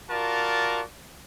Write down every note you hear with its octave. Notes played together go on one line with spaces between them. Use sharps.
F4 F#4 A#4 D5 A5